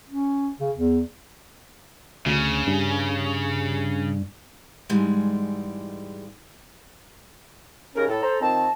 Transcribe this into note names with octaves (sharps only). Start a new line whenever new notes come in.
C#4
C#3
E2
D2 C#3
G2
G#2 E3 G3 G#3
D#2 C#3 C#4 A#4
A2 A4
C5 A#5
D#3 F3 C4 A5